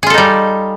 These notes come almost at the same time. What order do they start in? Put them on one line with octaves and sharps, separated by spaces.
G#4 F4 A4 D#4 G3